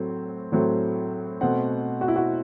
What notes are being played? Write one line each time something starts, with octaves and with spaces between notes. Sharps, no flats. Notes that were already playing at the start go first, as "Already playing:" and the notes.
Already playing: A2 F#3 A3 C4
A2 F#3 A3 C4
B2 A3 C4 F#5
F#4
E4
F#4